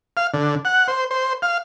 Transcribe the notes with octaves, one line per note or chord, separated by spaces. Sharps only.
F5
D3
F#5
C5
C5
F5